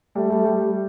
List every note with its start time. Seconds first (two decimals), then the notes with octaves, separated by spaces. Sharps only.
0.15 G3 A3
0.30 G3
0.45 G3